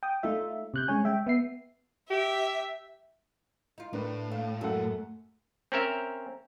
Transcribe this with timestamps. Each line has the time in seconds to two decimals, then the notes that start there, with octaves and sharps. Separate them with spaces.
0.03 G5 D#6
0.23 A3 D#4 F4 E5
0.74 C3 F#6 G6
0.88 G#3 C#4 C#5 G#5
1.04 G#3 E5 G5
1.27 B3 E5 C7
2.10 G4 E5
3.78 D#4 F4
3.93 A2 D4 A#4 B4
4.31 A3 F5
4.61 F#2 A3 A4 F#5
5.72 C4 C#4 A#4 E5